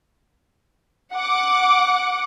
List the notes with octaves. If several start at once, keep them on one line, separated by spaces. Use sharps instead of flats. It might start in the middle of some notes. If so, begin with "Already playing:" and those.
F#5 D6